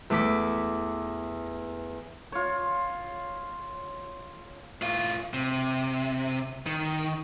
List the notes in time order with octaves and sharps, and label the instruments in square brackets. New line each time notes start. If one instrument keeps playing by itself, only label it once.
[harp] E2 A3 D6 B6
[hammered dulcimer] F4 C#5
[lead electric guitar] A2 F4
C3
D#3